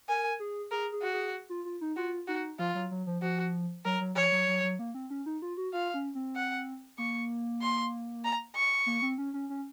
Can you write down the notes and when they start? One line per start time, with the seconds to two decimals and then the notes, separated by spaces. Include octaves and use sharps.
0.09 A#4 G#5
0.40 G#4
0.71 G#4 A#4
0.92 G#4
1.02 F#4
1.13 G#4
1.50 F4
1.65 F4
1.81 D#4
1.96 F4 F#4
2.28 D#4 F#4
2.59 F3 F4
2.75 F#3
2.91 F#3
3.07 F3
3.22 F3 F#4
3.85 F#3 A#4
4.01 F#3
4.16 F3 C#5
4.32 F#3
4.48 F#3
4.63 F#3
4.79 A#3
4.94 C4
5.10 C#4
5.26 D#4
5.42 F4
5.57 F#4
5.73 F4 F5
5.94 C#4
6.15 C4
6.36 F#5
6.98 A#3 C#6
7.62 C6
8.24 A#5
8.55 C#6
8.86 A#3
9.02 C4
9.18 C#4
9.34 C#4
9.50 C#4